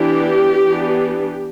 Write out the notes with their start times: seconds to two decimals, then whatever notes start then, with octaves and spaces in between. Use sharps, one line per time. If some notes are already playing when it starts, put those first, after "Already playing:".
Already playing: E3 B3 D4 G4
0.65 E3 B3 D4